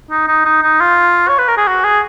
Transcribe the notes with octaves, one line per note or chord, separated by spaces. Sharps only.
D#4
D#4
D#4
D#4
F4
C#5
B4
A#4
G#4
F#4
G#4